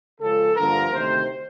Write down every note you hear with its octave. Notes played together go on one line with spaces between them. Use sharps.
C#2 C#3 F3 A4
G2 D3 F3 A#3 A#4
D2 C3 D#3 C5